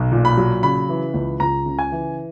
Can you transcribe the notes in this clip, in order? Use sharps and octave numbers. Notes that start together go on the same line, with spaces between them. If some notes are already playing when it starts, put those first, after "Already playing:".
Already playing: B1
A#2
B5
F#3
C#3 B5
E3
C#2
C#2 A#5
C#3
G#5
E3